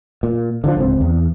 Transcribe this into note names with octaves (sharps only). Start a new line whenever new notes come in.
A#2
D3 E3 F3
D1 C#2 C4
E2